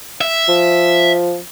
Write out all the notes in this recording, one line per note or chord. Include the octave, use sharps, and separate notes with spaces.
E5
F3